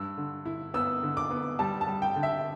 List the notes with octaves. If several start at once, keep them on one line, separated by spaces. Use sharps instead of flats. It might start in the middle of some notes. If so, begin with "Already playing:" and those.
Already playing: G2 E6
D3
E4
B3 E6
D3
D6
B3
G3 A5
A5
G3
G5
D3
E5